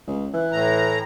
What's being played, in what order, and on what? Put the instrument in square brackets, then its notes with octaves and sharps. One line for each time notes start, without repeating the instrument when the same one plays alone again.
[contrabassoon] C#2
E3
[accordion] A2 A#5